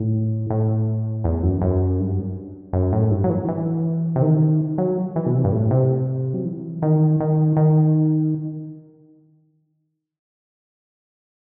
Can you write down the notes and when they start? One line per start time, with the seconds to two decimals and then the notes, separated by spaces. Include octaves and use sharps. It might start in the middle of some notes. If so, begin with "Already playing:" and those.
Already playing: A2
0.50 A2
1.24 E2
1.43 F#2
1.62 F#2
1.99 G2
2.73 F#2
2.93 A2
3.11 G2
3.24 F#3
3.30 E3
3.48 E3
4.16 C3
4.22 D#3
4.78 F#3
5.16 E3
5.26 B2
5.34 C3
5.44 G2
5.52 A2
5.71 C3
6.34 F#3
6.45 E3
6.82 D#3
7.20 D#3
7.57 D#3